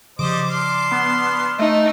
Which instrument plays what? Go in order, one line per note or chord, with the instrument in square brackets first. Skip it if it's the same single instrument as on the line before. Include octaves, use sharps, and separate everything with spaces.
[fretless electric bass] C#3 F3 [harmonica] G3 C5 D#5 [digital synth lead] D6
[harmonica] D4 C6 F6
[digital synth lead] B3
[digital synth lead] A3 [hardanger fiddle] D#4